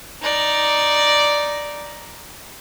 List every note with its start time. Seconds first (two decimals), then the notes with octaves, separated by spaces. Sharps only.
0.23 D#4 D5